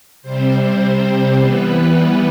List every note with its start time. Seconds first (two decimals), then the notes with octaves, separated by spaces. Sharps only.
0.23 C3 G3 C4 C5
1.39 E3 G3 B3 B4